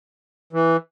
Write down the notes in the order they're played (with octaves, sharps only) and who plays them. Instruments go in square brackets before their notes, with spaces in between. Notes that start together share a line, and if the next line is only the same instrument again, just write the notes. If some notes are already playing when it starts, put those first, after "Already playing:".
[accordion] E3